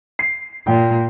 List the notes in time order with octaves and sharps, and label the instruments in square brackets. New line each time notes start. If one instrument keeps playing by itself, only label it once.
[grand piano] C7
[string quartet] A#2 [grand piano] G5